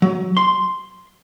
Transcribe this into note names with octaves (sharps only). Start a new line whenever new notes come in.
F#3
C6